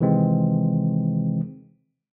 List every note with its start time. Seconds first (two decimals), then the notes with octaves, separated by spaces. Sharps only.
0.01 C3 D#3 E3 G#3 C4